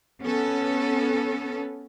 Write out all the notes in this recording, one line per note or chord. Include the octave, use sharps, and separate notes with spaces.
B3 C#4 A4